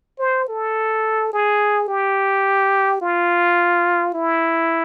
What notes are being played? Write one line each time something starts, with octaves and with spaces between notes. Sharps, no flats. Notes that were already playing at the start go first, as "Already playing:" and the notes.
C5
A4
G#4
G4
F4
E4